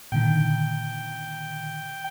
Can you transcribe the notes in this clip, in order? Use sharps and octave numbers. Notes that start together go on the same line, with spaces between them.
A#2 D3 D#3 G5